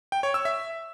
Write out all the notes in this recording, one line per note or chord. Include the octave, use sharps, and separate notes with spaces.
G5
C#5
E6
E5